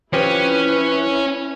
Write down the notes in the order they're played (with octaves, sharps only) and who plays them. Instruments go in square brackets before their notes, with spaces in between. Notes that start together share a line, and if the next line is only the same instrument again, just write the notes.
[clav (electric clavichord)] F3 C4 G4 [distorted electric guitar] C#4 [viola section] E4 [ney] B4